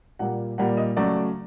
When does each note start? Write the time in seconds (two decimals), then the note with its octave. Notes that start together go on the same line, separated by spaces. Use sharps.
0.19 A#2 G3 A#3 F#5
0.58 A#2 G3 A#3 F#5
0.77 D#5
0.96 C#3 F#3 A3 D5